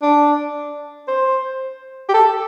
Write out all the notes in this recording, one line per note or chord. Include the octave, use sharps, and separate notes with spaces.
D4
C5
G4
A4